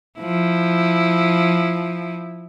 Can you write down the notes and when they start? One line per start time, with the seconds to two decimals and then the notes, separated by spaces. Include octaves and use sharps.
0.20 F3 E4